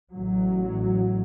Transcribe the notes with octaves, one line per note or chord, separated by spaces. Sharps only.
A1 F#3